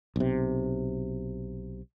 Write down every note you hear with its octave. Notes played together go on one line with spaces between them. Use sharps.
B1 C3